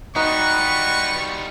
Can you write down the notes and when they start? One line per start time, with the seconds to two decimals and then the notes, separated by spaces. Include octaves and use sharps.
0.16 G3 D#4 F4 F#4 B4 C#6